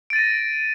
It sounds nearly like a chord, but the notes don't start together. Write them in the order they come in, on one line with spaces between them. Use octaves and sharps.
D7 A6 D#7 A#6